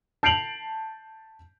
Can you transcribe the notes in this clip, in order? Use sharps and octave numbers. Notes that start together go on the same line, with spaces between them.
A5 G6 C7 D7 F7 F#7